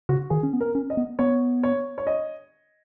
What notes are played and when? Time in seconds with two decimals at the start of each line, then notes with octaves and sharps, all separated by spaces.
0.09 C#3 F#4
0.30 D#3 G#4
0.43 C#4
0.53 B3
0.61 A#4
0.75 C#4
0.90 D#5
0.97 B3
1.19 B3 C#5
1.63 C#5
1.98 C#5
2.07 D#5